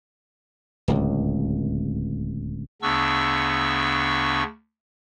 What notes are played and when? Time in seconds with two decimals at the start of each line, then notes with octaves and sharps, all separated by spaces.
0.88 D1 C#2
2.82 D2 C#3 B3 D4 C#6 E6